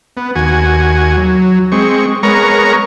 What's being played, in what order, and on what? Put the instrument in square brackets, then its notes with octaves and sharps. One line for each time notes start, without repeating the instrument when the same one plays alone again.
[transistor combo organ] B3
D#2 F#4 G#5
F#3
G#3 C4 C#6
G#3 B3 A#4 C#5 A#5 C#6